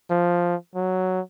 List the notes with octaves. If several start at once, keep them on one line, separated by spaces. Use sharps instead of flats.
F3
F#3